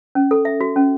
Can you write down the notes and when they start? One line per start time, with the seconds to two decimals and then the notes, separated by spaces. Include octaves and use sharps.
0.15 C#4
0.31 A4
0.45 E5
0.61 F#4
0.76 C#4